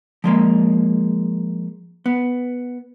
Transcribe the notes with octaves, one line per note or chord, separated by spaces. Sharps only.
F3 G#3 A#3
B3